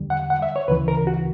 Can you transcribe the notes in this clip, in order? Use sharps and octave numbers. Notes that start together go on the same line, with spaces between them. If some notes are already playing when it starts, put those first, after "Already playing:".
Already playing: E2 D3 G3
F#5
F#5
E5
C#5
D2 C#3 E3 B4
A#4
F#4